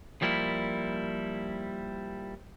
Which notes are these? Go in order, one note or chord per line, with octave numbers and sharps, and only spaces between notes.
F3 G3 A#3 E4